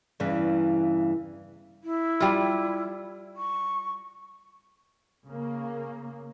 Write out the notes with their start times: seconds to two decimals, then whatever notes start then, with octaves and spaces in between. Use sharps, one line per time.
0.20 E2 G2 C#3 E3
1.82 E4
2.20 G3 F4
3.37 C#6
5.27 C#3 A#3